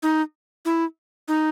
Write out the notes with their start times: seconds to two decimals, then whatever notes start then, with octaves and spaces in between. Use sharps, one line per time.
0.03 D#4
0.65 E4
1.28 D#4